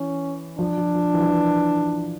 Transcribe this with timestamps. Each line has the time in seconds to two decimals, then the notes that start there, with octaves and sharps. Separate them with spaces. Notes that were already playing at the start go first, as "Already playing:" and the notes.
Already playing: E3 C#4
0.58 F3 D4
0.77 F3
0.95 F3
1.14 E3
1.20 F3
1.28 E3